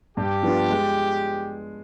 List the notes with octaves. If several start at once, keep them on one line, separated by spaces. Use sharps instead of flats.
G2 G4
F3 B3 D4 F4
G#3